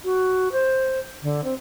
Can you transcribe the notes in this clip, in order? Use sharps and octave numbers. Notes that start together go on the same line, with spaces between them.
F#4
C5
D3
C4